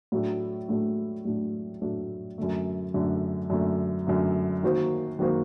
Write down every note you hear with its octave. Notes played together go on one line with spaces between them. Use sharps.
A2 F#3 A3 D4
A2 F#3 A3 D4
A2 F#3 A3 D4
A2 F#3 A3 D4
F#2 D3 A3
F#2 D3 A3
F#2 D3 A3
F#2 D3 A3
D#3 F#3 A#3 F#4 C5
D#3 F#3 A#3 F#4 C5